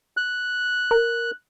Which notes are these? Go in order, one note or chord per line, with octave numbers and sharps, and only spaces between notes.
F#6
A#4